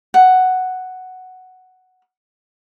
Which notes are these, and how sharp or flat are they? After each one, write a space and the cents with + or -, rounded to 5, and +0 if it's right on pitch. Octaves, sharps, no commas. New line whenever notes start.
F#5 +5